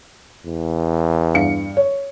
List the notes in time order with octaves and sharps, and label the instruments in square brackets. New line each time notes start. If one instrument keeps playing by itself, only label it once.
[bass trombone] E2
[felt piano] G2 F5 C#7
C#5